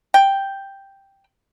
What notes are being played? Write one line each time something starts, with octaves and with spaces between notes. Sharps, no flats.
G5